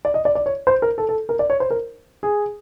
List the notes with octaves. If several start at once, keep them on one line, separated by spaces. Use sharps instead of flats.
D5
D#5
D5
D5
C#5
C5
A#4
A4
A4
A#4
D5
C#5
C5
A#4
G#4